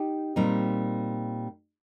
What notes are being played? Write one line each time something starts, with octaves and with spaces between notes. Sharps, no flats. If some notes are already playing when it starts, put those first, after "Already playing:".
Already playing: D#4 G4
A#2 G3 C4 D#4